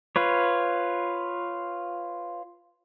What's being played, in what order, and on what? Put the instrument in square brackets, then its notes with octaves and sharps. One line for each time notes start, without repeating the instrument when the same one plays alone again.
[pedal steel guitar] F4 B4 C#5